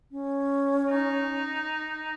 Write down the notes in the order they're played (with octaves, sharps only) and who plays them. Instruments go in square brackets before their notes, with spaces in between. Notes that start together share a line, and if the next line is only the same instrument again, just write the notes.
[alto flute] C#4
[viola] D#4